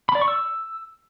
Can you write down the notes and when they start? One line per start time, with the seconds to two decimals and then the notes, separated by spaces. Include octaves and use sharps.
0.09 B5
0.15 D5
0.21 C#6
0.28 E6